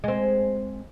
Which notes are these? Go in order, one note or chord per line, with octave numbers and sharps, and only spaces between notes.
G#3 C4